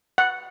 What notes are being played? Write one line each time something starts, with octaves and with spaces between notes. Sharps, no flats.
F#5